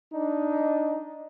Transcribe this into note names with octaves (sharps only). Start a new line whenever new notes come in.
D4 D#4